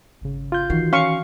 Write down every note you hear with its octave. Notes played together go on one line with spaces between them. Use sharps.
G#1 C#3
F4 G6
D#3 E3 D#4 F#4 C7
C#4 F5 C#6